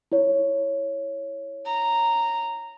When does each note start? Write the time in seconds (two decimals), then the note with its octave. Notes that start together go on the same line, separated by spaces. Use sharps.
0.12 E4 C#5
1.66 A#5